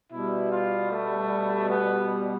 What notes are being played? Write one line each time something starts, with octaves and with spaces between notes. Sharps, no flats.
B2 G3 E4
F4
A3
B3